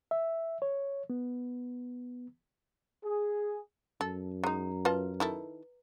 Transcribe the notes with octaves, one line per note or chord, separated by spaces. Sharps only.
E5
C#5
B3
G#4
F#2 A4
G#3 D#4 F#5 A#5
F4 B4 D#5 A5
D#3 E4 A4